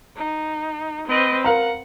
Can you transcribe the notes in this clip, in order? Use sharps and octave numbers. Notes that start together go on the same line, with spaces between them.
D#4
C4 B4 D#5
A#4 F5 F#5 A#5